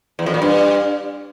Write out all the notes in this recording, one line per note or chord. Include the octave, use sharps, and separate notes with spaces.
E2
F2
A#2
G2